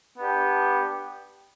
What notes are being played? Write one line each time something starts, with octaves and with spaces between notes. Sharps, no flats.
B3 D4 G4